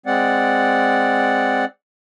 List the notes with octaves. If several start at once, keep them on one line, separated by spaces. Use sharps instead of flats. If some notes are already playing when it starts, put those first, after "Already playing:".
G#3 C4 D5 F#5